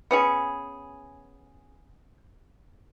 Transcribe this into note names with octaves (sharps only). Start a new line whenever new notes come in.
B3 C#4 G#4